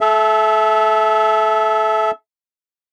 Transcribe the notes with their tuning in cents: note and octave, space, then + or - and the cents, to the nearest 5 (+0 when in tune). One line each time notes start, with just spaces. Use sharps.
A4 -30 E5 +0